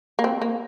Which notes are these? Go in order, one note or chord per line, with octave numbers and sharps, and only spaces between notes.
A#3
C4
A#3